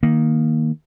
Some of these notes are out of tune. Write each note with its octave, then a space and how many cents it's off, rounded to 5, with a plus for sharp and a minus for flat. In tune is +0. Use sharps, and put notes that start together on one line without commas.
D#3 +0 A#3 +0